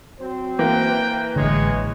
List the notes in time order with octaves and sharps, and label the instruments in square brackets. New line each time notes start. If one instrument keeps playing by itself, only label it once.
[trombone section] F#3 C4 C5
[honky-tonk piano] E3 A#3 [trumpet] G5
[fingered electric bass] A1 D3 [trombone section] G#3 [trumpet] C#5